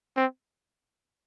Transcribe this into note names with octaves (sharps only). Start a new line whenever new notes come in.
C4